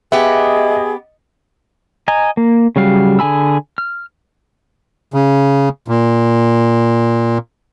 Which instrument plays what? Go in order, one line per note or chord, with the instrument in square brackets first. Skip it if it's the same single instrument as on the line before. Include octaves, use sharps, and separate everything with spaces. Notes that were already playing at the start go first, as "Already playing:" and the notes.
[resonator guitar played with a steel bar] B3 G4 [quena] G#4 [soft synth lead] D#5 [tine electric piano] E5
[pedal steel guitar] D#5 G#5 A#5
A#3
C#3 F#3 G3 F5
D3 G#4 G#5 B5 E6
F6
[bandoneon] C#3
A#2